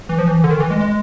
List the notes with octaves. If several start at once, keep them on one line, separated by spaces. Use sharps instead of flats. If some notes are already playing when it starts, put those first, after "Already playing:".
E3
F3
E3
D3
D#3
E3
G#3
G#3